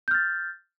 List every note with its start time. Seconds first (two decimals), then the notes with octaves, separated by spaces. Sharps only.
0.08 G6
0.11 F6
0.15 A6